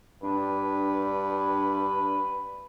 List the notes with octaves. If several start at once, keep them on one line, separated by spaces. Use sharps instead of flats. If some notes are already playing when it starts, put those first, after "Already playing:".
G2 D4 B4